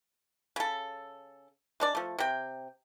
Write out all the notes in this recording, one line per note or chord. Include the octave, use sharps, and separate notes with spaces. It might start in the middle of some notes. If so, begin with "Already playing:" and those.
C#3 A4
G#3 D4 D5
F3 A3
C3 G5